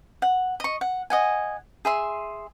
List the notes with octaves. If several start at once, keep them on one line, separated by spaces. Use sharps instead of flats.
F#5
D#5 C#6
F#5
D#5 F#5 G#5
G#4 E5 C6